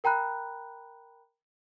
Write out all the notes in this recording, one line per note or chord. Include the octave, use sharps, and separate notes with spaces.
A#4 G5 A#5 B5 F#6